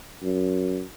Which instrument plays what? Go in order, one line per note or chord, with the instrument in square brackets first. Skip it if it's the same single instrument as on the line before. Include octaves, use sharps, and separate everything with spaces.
[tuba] F#2